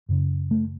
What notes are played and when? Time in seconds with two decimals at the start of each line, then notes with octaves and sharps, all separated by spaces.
0.09 F#2 C#3
0.51 A3